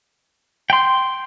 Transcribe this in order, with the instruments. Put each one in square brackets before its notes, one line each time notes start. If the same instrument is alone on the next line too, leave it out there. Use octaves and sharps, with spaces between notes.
[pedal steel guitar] G5 C6